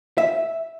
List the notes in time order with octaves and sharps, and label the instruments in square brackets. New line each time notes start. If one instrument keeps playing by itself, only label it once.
[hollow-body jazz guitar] E5